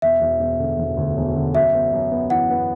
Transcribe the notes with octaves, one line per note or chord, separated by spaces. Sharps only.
E1 E5
E1
E1
D3
E1
D2
E1
D3
F#2 E5
B3
F#2
B3
E3 F#5
B3